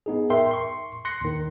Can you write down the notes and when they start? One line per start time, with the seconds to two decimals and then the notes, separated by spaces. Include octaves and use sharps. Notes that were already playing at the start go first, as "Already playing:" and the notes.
0.06 B3 D#4 G#4
0.30 A#4 E5 G5 C6
0.51 C6 C#6
1.05 C6 F#6 A#6 C#7
1.22 D#2 D#3